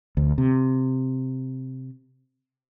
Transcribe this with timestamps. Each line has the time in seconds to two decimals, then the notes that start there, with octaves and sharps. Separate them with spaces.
0.17 D2
0.38 C3